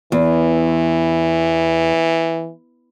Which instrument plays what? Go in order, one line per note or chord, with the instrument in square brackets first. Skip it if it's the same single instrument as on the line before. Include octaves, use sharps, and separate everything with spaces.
[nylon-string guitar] E2 [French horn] E3